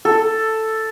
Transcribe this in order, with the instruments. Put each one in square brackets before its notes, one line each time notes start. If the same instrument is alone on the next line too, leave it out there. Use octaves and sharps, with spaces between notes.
[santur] A4